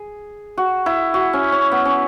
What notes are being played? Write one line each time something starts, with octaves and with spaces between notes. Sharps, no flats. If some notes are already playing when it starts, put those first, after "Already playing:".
Already playing: G#4
F#4
E4
F#4
C#4
C#4
B3
C#4